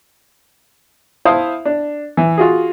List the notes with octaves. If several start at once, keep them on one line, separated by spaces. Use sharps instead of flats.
E4 C5 E5 F5 A5 D#6
D4
E3
F4 F#4 G#4